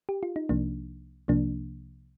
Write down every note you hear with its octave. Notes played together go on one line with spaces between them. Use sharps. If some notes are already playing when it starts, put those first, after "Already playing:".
G4
F4
D#4
C2 C3 F3 A#3 D4
C2 C3 F3 A#3 D4